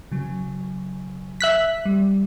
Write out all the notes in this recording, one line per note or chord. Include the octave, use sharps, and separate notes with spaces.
C#3 F#3
E5 F#6 B6
G3